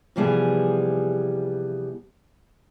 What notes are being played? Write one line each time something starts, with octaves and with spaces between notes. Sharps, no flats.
C3 E3 F3 G3 B3 G#4